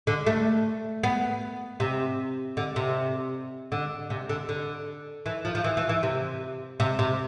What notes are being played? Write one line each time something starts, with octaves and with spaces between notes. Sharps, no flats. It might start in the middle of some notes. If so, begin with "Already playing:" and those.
D3
A3
B3
C3
D3
C3
D3
C3
D3
D3
E3
F3
F3
E3
E3
E3
C3
C3
C3